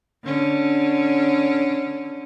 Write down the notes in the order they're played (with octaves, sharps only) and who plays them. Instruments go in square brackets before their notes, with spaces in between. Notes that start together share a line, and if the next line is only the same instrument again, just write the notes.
[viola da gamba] D3 C#4